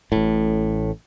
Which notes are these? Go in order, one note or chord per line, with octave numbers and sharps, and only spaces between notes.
A1 A2